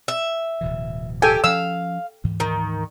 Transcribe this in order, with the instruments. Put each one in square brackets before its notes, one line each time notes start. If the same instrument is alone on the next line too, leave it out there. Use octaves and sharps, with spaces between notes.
[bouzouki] E5
[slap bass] D1 B2 E3
[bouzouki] G4 [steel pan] A4 G5 G#5
[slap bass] F3 C#4 [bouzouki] F5 [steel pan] E6
[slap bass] D2 G#2 E3
[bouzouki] D#3